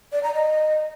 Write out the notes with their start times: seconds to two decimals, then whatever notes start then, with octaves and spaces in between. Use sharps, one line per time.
0.12 D5
0.23 A#5
0.34 D#5